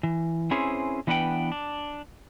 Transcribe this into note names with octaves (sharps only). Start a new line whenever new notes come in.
E3
C4 C#4 E4 G#4 B4 C5
E3 B3 D4 B4 F#5 G5
D4